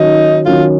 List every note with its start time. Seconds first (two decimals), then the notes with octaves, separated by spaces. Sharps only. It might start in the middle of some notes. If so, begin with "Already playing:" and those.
Already playing: D#3 F#3 C#4 D#4
0.46 D#3 F#3 C#4 F4